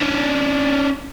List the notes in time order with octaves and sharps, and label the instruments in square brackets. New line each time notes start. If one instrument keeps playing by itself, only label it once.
[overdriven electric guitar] C#4 D4